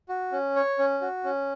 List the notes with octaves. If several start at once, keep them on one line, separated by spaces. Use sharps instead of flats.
F#4
C#4
C#5
C#4
F#4
C#4